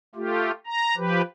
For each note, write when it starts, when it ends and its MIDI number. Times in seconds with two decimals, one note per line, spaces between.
0.15 0.51 57
0.15 0.51 65
0.15 0.51 67
0.66 0.95 82
0.97 1.21 53
0.97 1.21 67
0.97 1.21 71